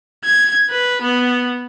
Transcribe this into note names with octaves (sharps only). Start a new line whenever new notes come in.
G#6
B4
B3